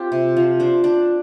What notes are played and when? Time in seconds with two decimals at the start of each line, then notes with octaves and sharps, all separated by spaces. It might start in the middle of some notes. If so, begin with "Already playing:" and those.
Already playing: C4 F4 G4
0.12 C3
0.37 F3
0.60 D4 C5
0.84 D4 D5